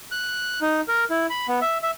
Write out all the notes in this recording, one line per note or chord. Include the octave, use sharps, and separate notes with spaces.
F#6
D#4
A#4
E4
B5
B3
E5
E5